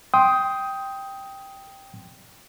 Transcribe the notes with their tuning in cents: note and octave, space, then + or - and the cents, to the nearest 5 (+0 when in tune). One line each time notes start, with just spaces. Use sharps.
G5 +0 C6 +0 D#6 +15